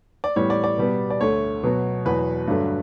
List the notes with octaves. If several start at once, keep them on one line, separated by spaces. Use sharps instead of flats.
D5
A2 E3 G3 B3 C#5
D5
D5
B2 G3 B3
D5
D2 D3 A3 C#5
B2 F#3 B3
E2 B2 F#3 B4
G2 D3 F#3 A3